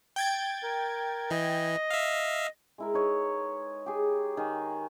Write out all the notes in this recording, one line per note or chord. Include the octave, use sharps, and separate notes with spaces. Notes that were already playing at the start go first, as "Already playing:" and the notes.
G5 G#6 A6
A#4
E3 D#5
E5 F5
G#3 E4 A#4
D#4 B4 C#5
G4 G#4
D#3 G#5